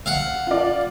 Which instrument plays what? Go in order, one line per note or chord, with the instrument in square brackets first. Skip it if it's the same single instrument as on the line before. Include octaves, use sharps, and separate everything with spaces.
[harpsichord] F5 F#5
[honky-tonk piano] F4 D5